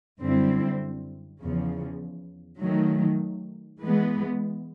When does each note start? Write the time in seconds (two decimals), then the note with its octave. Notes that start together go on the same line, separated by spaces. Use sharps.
0.21 F#2 D3 G3 C4 E4
1.41 E2 C#3 F3
2.61 D#3 F#3 A3
3.81 E3 G#3 B3